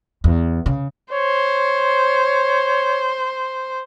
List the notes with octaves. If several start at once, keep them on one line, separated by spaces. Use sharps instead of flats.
E2
C#3
C5 C#5